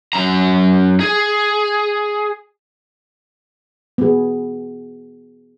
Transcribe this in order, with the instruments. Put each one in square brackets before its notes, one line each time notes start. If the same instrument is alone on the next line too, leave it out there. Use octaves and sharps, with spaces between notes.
[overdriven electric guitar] F#2 A#5
G#4
[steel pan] B3 G#4